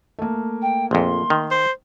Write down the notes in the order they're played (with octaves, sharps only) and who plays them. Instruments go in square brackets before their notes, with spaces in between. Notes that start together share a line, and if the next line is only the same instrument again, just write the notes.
[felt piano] A3 A#3
[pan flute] G5
[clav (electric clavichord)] A#1 F2 [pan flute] C6
[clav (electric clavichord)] D#3
[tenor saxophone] C5